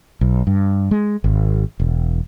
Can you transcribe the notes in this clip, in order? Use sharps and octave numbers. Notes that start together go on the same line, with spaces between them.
B1
G2
G#3
G#1
E1